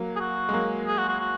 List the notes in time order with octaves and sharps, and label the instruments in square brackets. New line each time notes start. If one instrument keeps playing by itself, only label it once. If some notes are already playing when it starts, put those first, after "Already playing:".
Already playing: [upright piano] F#3 A#3
[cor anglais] G#4
F#4
[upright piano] G#3
F#3 A#3
[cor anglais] G#4
F#4
F#4
F#4